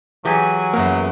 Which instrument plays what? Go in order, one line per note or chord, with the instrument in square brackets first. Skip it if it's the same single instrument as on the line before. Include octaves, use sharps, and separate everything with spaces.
[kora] E3 G4 G#4 [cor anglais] F#3 [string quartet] G#5
[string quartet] F#2 C#3 E4 [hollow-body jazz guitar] A#3 B3